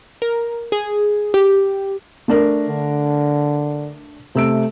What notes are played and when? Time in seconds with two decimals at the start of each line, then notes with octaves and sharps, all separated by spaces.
0.22 A#4
0.72 G#4
1.34 G4
2.28 A3 D4 A#4
2.69 D3
4.35 C3 A3 E6 D7